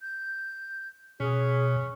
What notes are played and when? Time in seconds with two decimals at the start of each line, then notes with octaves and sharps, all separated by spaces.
0.02 G6
1.20 B2 C#4 G#4